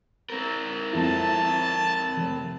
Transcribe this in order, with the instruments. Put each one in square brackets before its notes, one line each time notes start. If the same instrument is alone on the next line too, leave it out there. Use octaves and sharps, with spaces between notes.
[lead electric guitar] C4 A#4
[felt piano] F2 E4 [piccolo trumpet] A5
[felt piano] F1